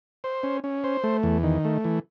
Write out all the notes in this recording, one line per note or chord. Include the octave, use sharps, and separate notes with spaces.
C5
C#4
C#4
C5
A3
E2
D#3
A3
E3